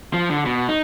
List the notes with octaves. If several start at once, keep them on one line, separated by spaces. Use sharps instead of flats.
F3
D3
B2
D#4